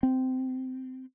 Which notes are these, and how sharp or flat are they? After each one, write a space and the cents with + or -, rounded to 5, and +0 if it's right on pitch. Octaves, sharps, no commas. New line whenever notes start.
C4 -15